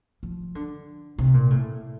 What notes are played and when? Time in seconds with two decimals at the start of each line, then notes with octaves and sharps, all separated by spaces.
0.23 F3
0.55 D3
1.18 C3
1.34 A#2
1.50 A2